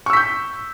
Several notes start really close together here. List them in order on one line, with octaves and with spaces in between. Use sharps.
C#6 E6 B6 G6